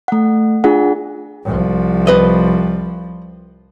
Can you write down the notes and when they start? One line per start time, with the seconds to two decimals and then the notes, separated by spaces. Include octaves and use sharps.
0.08 A3 F#5
0.64 D4 F4 G#4 F#5
1.45 C2 F3
2.07 B4 D#5